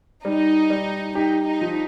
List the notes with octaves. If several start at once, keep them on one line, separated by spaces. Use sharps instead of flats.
G3 D#4
G3
D#4 G4
D#4
F3